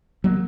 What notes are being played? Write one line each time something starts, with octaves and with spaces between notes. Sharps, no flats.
F#3 A#3